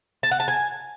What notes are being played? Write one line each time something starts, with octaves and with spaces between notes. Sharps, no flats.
A5
F#5
A5
G#5